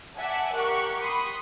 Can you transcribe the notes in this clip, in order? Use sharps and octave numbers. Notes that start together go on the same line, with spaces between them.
D5 E5 F#5 G#5 A5
G4 A#4 C#6 F#6
B5 C6 D#6